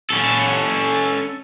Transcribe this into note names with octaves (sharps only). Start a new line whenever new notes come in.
C#4 A4